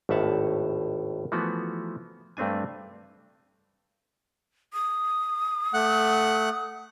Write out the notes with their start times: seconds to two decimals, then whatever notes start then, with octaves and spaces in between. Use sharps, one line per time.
0.09 G#1 D#2 A2 E5 F#5 A5
1.32 E3 F3 A3 B3 F#4
2.37 G2 A3 C4 D4 G#5
4.73 D#6
5.74 A3 F#5 F#6